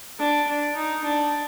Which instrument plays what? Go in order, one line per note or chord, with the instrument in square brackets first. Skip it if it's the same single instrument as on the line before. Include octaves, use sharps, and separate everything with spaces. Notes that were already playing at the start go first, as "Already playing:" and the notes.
[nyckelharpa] D4
D4
D#4
D4